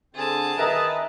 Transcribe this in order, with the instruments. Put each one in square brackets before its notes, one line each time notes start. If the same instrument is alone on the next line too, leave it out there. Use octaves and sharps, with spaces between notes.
[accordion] D3 C4 [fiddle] G#4 A5
[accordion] D#3 B4 D#5 [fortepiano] A#4 E5 A#5